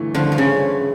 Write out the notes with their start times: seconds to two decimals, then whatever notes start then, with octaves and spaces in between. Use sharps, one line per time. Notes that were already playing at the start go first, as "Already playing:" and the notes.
Already playing: G1 G2 E3 A3
0.14 G2 D3 F3
0.32 F3
0.38 C#3